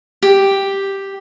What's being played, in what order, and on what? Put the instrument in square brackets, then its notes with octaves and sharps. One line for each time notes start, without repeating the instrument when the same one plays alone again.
[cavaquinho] G4